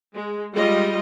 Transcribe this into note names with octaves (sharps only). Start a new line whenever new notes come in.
G#3
G3 G#3 F4 D#5